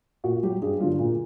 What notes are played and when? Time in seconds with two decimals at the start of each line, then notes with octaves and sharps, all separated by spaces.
0.24 A#2 F#4
0.43 F#3 G4
0.62 G2 G#4
0.80 F#3 F4
0.83 D3
0.99 A#2